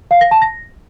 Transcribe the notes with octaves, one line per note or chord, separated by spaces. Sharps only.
F5
A#6
A5
A#6